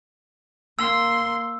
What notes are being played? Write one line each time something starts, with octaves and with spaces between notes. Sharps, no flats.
A#3 C6 E6